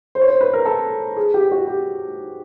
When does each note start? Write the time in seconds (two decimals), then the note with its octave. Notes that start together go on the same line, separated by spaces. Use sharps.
0.15 C5
0.21 C#5
0.28 C5
0.41 B4
0.53 A#4
0.66 A4
1.17 G#4
1.34 G4
1.51 F#4
1.67 G4